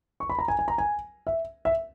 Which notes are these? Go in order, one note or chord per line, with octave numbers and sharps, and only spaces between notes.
C#6
B5
A#5
G#5
G#5
A#5
G#5
E5
E5